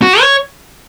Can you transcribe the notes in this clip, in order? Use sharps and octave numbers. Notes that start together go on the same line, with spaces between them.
F#4
C#5